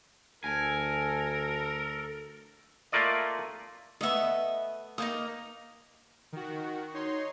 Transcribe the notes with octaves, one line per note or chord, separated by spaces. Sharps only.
D2 A4 A#4 G#5
A3 A#3 F4 D5 D#5
A3 B3 D#5 E5
A#3 D#4 C5 D#6
D#3 F#4
D#4 C#5 C6